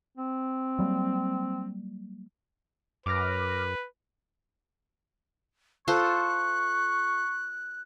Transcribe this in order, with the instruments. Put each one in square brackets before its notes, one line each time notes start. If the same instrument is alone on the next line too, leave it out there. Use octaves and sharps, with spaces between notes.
[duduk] C4
[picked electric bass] F#3 G3 A#3
[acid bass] F#2 [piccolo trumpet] B4 [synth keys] D6 F6 A#6
[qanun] F4 A4 C5 [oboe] C#6 [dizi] F#6